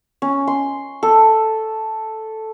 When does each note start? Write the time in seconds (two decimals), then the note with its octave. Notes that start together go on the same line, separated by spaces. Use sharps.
0.22 C#4
0.47 C6
1.03 A4